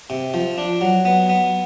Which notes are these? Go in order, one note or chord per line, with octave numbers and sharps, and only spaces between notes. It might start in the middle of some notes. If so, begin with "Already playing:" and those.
C3
F3
D4
F#3
B3
B3